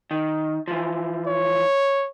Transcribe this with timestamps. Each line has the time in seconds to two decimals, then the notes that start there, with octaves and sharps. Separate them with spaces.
0.11 D#3
0.68 E3 F3
1.27 C#5